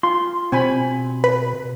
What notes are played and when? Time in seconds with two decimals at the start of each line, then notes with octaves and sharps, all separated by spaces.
0.03 F4 C6
0.52 B2 C4 G#5 B5
1.24 B4